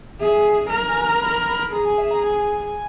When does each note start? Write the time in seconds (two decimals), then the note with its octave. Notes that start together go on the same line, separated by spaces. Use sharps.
0.20 G#4 E5
0.70 A#4
0.88 G#5
1.05 A#5
1.22 B5
1.47 B5
1.72 G#4 A#5
1.85 G#5
1.98 E5
2.11 A#5
2.23 G#5